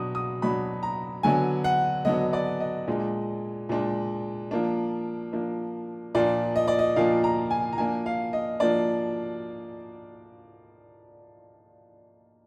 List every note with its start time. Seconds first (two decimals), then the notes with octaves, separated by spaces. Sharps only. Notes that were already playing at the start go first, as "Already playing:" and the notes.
Already playing: B2 F#3 D4 D#6
0.15 D#6
0.42 B2 F#3 D4 B5
0.83 A#5
1.23 D3 F#3 B3 D4 G#5
1.64 F#5
2.05 D3 F#3 B3 D4 D#5
2.33 D5
2.60 D#5
2.87 A#2 G#3 D4
3.69 A#2 G#3 D4
4.51 F3 A#3 D4
5.33 F3 A#3 D4
6.15 A#2 F3 A#3 D4 D5
6.56 D#5
6.68 D5
6.79 D#5
6.96 A#2 F3 A#3 D4 F5
7.24 A#5
7.51 G#5
7.73 A#5
7.78 F3 A#3 D4 G#5
8.06 F5
8.33 D#5
8.60 F3 A#3 D4 D5